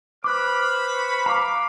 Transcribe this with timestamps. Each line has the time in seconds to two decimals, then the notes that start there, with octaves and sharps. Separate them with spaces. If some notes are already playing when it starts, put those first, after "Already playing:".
0.24 B4 C5 B5 D6 F6 F#6
0.91 C#6
1.26 F5 A#5 D6